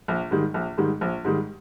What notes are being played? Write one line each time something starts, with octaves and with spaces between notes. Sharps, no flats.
A#1
G#2 D#3 G3
A#1
G#2 D#3 G3
A#1
G#2 D#3 G3